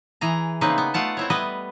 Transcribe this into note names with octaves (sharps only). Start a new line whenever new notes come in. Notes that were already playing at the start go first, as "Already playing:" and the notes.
E3 G#4 A#5
C#3 A#3 C4 D#4 B4
B3
A3 F4 F#5 A5
C4 E4 C#5
G3 B3 B4 D#5